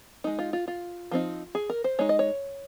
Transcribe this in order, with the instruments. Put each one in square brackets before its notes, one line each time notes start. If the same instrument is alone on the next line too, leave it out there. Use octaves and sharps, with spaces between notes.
[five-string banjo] G#3 D#4
F4
F4
F4
F3 C4 D#4
G#4
A#4
C5
G#3 D#4 C#5
D#5
C#5